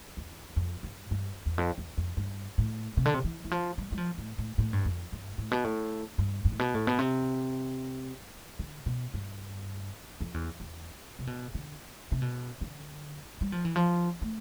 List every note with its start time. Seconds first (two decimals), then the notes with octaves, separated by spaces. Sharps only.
0.17 E2
0.56 F2
0.83 G2
1.11 G2
1.46 E2
1.58 F2
1.78 E2
1.97 F2
2.17 G2
2.58 A2
2.97 C3
3.05 D3
3.14 C3
3.24 E3
3.45 E3
3.51 F3
3.78 G3
3.92 G3
3.98 F3
4.18 A2
4.38 A2
4.58 A2
4.73 G2
4.85 F2
5.12 G2
5.38 A2
5.51 B2
5.64 A2
6.18 G2
6.45 G2
6.52 A2
6.59 B2
6.74 A2
6.87 B2
6.99 C3
8.59 D3
8.86 B2
9.14 G2
10.21 F2
10.34 E2
10.60 E2
11.19 C3
11.27 B2
11.55 D3
12.12 C3
12.22 B2
12.61 D3
13.41 G3
13.52 F3
13.65 E3
13.76 F3
14.22 A3